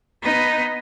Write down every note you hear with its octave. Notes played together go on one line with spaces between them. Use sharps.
B3 D#4